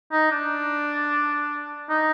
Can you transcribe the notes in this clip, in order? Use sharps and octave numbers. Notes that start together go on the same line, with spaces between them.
D#4
D4
D#4